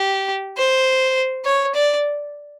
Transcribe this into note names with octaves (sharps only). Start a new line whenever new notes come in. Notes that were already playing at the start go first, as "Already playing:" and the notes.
Already playing: G4
C5
C#5
D5